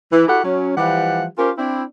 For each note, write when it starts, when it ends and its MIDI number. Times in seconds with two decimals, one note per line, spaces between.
0.12 0.25 52
0.28 0.39 64
0.28 0.39 66
0.28 0.39 67
0.28 0.39 69
0.28 0.39 78
0.44 0.72 54
0.44 0.72 61
0.77 1.25 52
0.77 1.25 53
0.77 1.25 55
0.77 1.25 67
0.77 1.25 78
1.38 1.50 61
1.38 1.50 65
1.38 1.50 67
1.38 1.50 70
1.38 1.50 72
1.58 1.82 60
1.58 1.82 62
1.58 1.82 64